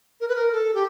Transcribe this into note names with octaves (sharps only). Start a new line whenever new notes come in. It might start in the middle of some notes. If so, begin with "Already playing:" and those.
A#4
B4
A#4
A4
G4